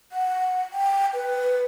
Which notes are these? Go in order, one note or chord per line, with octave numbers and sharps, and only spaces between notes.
F#5
G5
B4